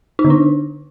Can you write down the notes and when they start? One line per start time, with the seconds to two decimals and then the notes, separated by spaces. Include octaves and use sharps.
0.19 D#4
0.25 D3
0.30 D4